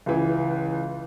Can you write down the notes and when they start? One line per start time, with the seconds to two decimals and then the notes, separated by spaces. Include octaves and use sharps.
0.06 C#2 E3